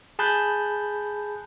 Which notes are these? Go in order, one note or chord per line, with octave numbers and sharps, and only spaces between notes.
G#4 A5 B5 F#6 G6